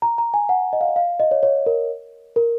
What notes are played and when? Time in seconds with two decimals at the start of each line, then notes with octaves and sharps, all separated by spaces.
0.02 A#5
0.18 A#5
0.34 G#5
0.49 F#5
0.73 D#5
0.81 F5
0.88 D#5
0.96 F5
1.20 D#5
1.31 C#5
1.43 C#5
1.66 A#4
2.36 A#4